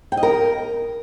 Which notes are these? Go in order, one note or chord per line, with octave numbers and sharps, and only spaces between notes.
G5
D#5
A#4